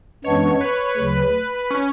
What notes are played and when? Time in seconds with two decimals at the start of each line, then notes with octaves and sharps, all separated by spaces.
0.25 F#2 E3 G#3 B3 D4 C#5
0.61 B4
0.97 D2 C#3 F#3
1.71 C#4